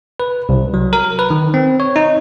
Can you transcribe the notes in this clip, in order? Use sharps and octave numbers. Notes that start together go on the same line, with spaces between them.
B4
C2
F#3
A#4
B4
D#3
C4
C#5
D#4